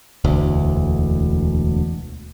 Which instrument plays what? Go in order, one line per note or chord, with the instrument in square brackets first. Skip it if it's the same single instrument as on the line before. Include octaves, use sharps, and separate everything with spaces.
[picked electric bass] E1 D2